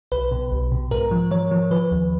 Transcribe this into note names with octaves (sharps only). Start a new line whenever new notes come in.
B1 B4
B2
B1
B2
G#2 A#4
F3
F3 C#5
F3
F3 B4
D#2